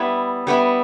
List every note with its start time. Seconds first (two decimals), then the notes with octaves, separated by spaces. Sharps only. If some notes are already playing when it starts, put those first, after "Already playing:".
Already playing: G3 B3 E4
0.47 G3 B3 E4